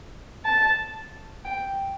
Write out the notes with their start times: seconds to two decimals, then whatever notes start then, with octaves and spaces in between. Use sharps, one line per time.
0.45 A5
1.44 G5